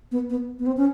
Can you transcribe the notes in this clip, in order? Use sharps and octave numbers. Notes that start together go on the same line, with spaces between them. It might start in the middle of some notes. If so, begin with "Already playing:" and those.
B3
B3
B3
C4
C#4